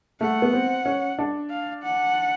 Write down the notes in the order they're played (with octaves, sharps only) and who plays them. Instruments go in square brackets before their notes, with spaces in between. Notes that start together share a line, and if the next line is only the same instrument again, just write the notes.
[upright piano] A3 [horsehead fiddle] F#5
[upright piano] B3
C4
C#4
D4
[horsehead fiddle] F5
F#5